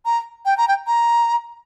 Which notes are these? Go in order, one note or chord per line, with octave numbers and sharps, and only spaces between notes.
A#5
G5
A#5
G5
A#5